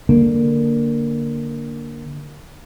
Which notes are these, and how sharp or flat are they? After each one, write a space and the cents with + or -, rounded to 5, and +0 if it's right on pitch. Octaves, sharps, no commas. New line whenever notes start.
D3 +0 A#3 +0